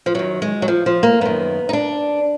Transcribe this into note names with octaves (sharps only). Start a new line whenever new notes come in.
F3
F#2 D#3 F#3
G#3
F#3
F3
F3
A#3
F#2 D#3 B3
D#4
D4